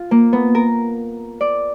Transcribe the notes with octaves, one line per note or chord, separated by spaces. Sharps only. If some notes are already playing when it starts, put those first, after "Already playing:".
Already playing: F4
A#3
B3
A#4
D5